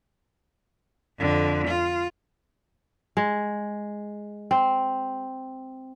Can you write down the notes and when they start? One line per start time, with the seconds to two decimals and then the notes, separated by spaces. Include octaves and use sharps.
1.19 F2 D3
1.68 F4
3.17 G#3
4.51 C4